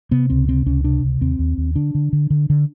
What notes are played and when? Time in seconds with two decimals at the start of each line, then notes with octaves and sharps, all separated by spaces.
0.11 C3 B3
0.30 C#2 C4
0.48 C3 C4
0.66 C#2 C#4
0.84 C3 D4
1.04 C#2
1.21 D#2 C4
1.39 D#2
1.58 D#2
1.76 D3 D4
1.95 D3
2.13 D3
2.30 D3
2.50 D3